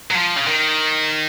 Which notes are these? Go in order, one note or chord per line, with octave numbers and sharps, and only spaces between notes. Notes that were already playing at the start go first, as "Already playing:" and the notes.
F#3
F3
C#3
D#3